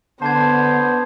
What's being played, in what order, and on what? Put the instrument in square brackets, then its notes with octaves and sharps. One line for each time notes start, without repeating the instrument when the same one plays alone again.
[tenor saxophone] D3 [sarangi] B3 [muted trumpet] C5 [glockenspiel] A5 G#6